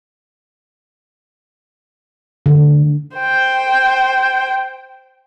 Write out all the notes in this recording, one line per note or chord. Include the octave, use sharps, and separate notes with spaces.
D3
C5 G5